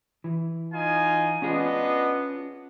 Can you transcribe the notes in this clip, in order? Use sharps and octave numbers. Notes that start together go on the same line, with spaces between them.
E3
D#4 F4 G#5
B3 C#4 D4 F4 G#4 D#5